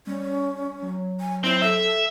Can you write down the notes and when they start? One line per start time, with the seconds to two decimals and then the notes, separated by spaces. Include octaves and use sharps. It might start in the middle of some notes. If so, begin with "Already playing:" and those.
0.07 G3 C#4
0.82 F#3
1.20 G#5
1.44 C4 E4
1.62 A4 E5